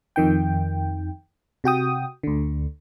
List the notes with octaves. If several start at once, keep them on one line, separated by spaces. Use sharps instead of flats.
F2 D#3 G5
C3 F#4 G5 D#6
D2 D3